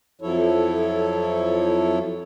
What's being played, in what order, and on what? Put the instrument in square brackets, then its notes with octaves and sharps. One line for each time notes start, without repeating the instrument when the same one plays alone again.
[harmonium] F2 F3 F#3 E4 A4 C#5